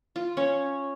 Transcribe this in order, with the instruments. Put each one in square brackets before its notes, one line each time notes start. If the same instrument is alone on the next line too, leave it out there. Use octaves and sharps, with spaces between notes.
[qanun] F4
C#4 C#5